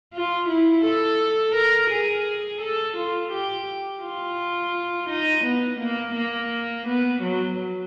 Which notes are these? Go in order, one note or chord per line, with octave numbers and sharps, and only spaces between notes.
F4
E4
A4
A#4
G#4
A4
F4
G4
F4
D#4
B3
A#3
A#3
B3
F#3